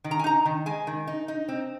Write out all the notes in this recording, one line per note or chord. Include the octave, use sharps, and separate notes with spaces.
D#3
A#5
G#5
D#4 A#5
D#3
G#3 G#5
D#3
D#4
D#4
C4